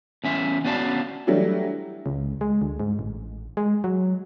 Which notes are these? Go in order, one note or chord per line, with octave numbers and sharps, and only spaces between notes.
E2 C#4 E5
B3 C#4 F#4 D5 F5 A5
E3 F#3 G3 A3 D4 E4
C#2
G#3
D2
G#2
A1
G#3
F#3